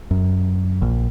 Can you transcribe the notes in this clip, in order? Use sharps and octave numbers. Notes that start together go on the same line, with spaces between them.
F#2
A#1